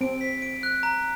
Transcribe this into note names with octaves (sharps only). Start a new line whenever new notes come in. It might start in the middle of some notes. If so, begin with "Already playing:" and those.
C4 D7
B6
D7
F#6
A#5